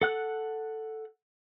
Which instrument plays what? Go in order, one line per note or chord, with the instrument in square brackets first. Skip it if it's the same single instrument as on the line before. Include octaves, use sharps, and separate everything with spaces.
[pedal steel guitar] A4 F#5 F#6